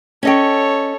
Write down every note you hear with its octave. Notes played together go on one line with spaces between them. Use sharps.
C#4 A4 C#5 D#5 G5